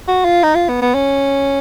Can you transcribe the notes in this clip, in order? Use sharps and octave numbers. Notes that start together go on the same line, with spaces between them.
F#4
F4
D#4
F4
B3
B3
C#4